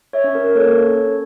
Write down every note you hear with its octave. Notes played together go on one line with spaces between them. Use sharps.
C#5 E5
C#4
A#4
A#3 A4 C#5
C#4